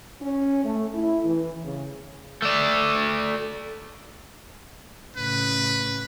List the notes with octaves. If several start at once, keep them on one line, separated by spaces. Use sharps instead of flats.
C#4
A3
E4
E3
C#3
A3 D5
A2 C#3 B4